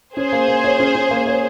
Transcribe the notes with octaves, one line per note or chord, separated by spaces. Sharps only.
C#4 G#4 C5
A#3
A#3
C#5
C#4
C#4
A#3
C#5